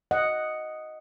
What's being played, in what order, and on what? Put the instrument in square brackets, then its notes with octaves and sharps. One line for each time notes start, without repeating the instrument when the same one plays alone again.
[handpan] D#5 F#5